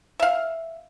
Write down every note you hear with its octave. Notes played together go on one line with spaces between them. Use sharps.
E5 F5